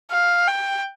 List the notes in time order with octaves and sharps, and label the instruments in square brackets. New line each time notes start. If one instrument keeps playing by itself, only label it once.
[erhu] F5
G5